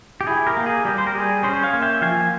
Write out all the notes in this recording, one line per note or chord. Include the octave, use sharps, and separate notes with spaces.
G4
E4 G#4
G4 A#4
A#3
G#4
G3 G4
C5
A#4
G3 G#4
C#4 G#4 C5
C#5 F5
A#3
E5 G5
F3 F5 G#5